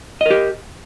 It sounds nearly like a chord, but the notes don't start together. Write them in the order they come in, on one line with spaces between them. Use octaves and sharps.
D#5 A#4 G4